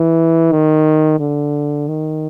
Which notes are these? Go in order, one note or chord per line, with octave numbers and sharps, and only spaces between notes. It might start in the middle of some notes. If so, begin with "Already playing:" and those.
Already playing: E3
D#3
D3
D#3